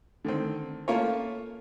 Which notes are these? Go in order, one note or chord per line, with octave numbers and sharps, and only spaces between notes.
D3 D#3 C4
A3 A#3 C#4 F4 C#5